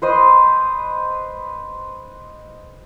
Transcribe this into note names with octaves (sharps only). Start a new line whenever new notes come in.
B4 C5 D#5 C6